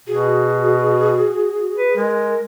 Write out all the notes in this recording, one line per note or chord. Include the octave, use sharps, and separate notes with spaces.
B2 F#4 G#4
B4
G#3 A#4